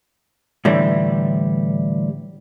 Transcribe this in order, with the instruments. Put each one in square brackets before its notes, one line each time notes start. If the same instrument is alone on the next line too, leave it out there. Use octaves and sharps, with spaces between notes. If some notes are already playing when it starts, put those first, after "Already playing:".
[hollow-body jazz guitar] A2 D3 E3 G3